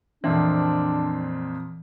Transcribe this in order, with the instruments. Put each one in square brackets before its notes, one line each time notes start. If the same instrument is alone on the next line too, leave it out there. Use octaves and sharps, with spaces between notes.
[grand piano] F2 A#2 C4 [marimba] E3 [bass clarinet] D4